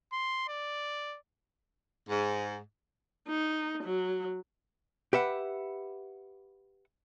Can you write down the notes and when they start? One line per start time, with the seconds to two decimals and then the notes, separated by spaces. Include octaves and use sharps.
0.12 C6
0.48 D5
2.09 G#2
3.28 D#4
3.84 F#3
5.13 G4 B4 E5 F#5